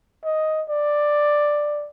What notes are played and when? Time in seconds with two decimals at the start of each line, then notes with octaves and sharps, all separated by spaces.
0.24 D#5
0.69 D5